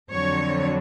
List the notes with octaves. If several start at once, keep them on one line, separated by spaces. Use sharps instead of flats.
F2 D3 F#3 C#5